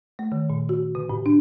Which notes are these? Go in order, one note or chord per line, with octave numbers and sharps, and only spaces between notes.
A3
D#3
A#2
F#4
C#3
A2
D4